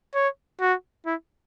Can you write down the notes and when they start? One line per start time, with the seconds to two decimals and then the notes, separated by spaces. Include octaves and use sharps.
0.14 C#5
0.60 F#4
1.06 E4